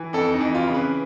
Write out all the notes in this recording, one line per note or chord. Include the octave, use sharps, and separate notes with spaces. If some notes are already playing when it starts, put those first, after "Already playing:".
Already playing: E3
F2 A4
D#4
E3
F4
C#3
B4